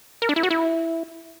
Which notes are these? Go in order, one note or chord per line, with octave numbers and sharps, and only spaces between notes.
A#4
D4
E4
F#4
E4